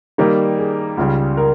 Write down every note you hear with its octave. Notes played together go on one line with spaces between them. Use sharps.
D#3 G3 A#3 D#4 G4
G#4
C#2 C#3 G3
A#4